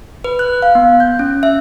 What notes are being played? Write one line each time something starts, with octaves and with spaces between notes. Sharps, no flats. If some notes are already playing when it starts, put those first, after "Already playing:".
B4
F#6
F5
B3
G6
C#4
E5